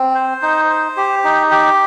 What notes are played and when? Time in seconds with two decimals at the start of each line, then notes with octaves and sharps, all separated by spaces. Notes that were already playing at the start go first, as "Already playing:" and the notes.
Already playing: C4
0.15 C5
0.42 D#4
0.69 C5
0.97 G4
1.24 D#4
1.51 G4